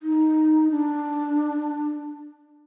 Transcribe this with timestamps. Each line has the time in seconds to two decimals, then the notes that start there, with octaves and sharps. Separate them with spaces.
0.03 D#4
0.71 D4